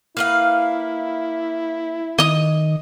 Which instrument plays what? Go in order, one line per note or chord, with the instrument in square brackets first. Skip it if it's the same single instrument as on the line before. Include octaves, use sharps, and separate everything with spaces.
[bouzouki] A#3 B4 F5 [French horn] E4
[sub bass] D#3 [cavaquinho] D#5 D#6